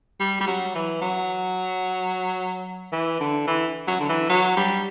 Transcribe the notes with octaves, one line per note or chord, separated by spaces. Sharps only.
G3
G3
F#3
E3
F#3
E3
D3
E3
F#3
D3
E3
F#3
G3